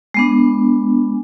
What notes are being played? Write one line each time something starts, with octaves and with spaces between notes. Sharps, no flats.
G#3 B3 D4